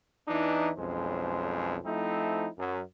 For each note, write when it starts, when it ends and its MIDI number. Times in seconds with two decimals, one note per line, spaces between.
0.28 0.71 40
0.28 0.71 52
0.28 0.71 62
0.28 0.71 63
0.77 1.77 35
0.77 1.77 41
0.77 1.77 56
0.77 1.77 61
0.77 1.77 72
1.85 2.48 53
1.85 2.48 57
1.85 2.48 60
1.85 2.48 63
1.85 2.48 64
2.58 2.79 42